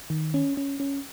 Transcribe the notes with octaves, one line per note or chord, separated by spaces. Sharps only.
D#3
C#4
C#4
C#4